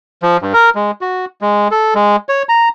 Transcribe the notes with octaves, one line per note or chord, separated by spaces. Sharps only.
F3
G2
A#4
G#3
F#4
G#3
A4
G#3
C#5
A#5